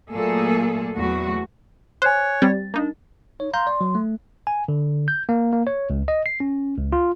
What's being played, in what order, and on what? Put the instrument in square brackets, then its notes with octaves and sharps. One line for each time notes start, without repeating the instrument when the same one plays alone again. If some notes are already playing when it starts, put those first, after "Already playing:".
[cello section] A#2 F#3 A3 A#3 G#4 A4
E2 F#3 A3 F#4
[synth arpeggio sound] C5 [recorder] C#5 [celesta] G#5 F#6
[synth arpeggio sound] G3 C4 [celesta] A6
[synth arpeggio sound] A#3 D#4 [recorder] D4
[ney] D#4 [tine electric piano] C#5
[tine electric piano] F5 A#5 G6 [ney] C6
[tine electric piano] D5
F#3
A3
G#5
D3
G6
A#3
A#3
C#5
C#2
D#5
C7
C#4
C#2
F4